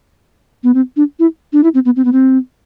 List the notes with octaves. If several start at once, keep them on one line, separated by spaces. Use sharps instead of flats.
B3
C4
D4
E4
D4
E4
C4
B3
C4
B3
C4